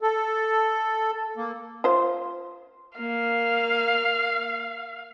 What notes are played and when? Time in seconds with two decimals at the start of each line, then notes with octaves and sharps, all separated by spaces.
0.01 A4
1.37 A#3
1.84 F4 C5
2.98 A#3 F5